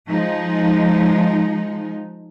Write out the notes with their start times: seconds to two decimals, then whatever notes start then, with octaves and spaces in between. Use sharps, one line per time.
0.10 F3 G#3 D#4